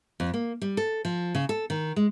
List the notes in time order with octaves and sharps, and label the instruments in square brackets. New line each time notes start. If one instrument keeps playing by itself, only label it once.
[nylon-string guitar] F2
A#3
G3
A4
F3
C#3
A4
D#3
G#3